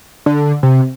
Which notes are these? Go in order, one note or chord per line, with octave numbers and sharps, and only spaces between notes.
D3
C3